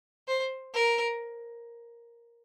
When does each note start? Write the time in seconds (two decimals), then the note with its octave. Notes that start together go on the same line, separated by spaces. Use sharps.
0.28 C5
0.74 A#4